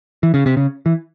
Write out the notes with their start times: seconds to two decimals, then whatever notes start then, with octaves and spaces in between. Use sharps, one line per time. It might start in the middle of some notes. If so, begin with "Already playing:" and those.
0.23 E3
0.34 C#3
0.46 C3
0.57 C#3
0.86 E3